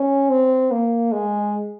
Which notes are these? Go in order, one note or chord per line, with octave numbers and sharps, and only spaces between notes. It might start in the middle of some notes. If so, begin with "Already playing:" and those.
Already playing: C#4
C4
A#3
G#3